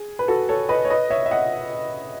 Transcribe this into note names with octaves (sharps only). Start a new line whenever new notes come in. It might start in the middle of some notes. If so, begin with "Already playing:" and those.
Already playing: G#4
B4
F#4 A4
A4 C#5
B4 D#5
C#5
B4 D#5
C#5 E5
E5
D#5 F#5